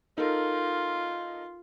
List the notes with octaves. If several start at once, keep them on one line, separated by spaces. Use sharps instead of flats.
D#4 F4 A4 A#4